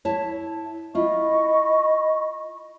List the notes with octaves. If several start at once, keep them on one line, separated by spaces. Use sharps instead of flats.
E4 C#5 A5
E4 F4 D#5 B5 C#6